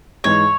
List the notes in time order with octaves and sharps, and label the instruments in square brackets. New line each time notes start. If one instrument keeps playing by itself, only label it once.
[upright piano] G#2 E3 G#3 [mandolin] C#5